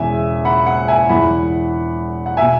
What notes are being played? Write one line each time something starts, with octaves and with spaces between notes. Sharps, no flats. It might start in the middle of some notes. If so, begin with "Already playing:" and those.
Already playing: E1 E2 C#3 E3 E5 G#5
F#5 B5
F#5
E5 G#5
E1 E2 E3 F#5 B5
F#5
B2 E5 G#5